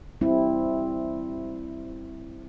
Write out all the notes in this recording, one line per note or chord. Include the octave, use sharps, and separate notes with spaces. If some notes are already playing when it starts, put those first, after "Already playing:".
G3 C4 E4